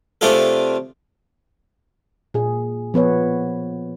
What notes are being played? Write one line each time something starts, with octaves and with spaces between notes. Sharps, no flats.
C3 A3 D4 F4 G#4 A4
A#2 G#4
F3 B3 B4 C#5